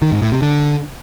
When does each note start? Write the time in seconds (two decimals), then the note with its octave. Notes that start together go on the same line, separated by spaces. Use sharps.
0.02 D#3
0.12 G#2
0.22 A2
0.32 C3
0.42 D3